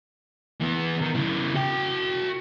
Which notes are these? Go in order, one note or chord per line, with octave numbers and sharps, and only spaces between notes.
E3 B3
D#3
C#3 E4
F#4 G5